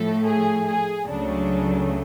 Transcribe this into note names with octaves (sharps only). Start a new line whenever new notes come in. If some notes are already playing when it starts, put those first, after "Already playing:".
Already playing: A2 F3 A3 A4
G#4
G#4
C#2 C#3 F#3 A3 D4